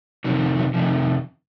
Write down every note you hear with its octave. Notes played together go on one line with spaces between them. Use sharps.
F2 C3 D#3 F#3
F3
F#3
F2 C3 D#3 F3